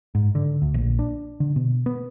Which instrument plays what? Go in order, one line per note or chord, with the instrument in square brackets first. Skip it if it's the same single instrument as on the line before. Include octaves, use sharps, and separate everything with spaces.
[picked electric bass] G#2
D3
D2
A#1
D4
D3
B2
B3